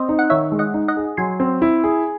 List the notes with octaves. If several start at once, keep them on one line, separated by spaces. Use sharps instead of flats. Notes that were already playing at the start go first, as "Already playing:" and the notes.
Already playing: C4 C5 D#5
D#4
F#5
D#3 C#5 E5
G#3
D#5 F#5
D#4
D#5 F#5
G#4
F#3 G#5 C6
C4
E4
G#4